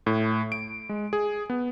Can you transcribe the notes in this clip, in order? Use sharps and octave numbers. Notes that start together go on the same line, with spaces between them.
A2
D7
G#3
G#4
B3